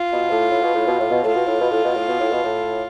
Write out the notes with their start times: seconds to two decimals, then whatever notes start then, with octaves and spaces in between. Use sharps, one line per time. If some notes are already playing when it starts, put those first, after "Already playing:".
Already playing: F4
0.12 B2
0.31 A2
0.51 A2
0.62 B2
0.74 A2
0.87 B2
0.99 A2
1.11 B2
1.24 A2 F4
1.35 B2
1.47 A2
1.60 B2
1.71 A2
1.84 B2
1.96 A2
2.08 B2
2.21 A2
2.32 B2
2.44 A2